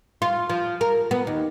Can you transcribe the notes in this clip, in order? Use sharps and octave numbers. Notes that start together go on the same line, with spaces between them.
F4
F3
A#4
B3
D#2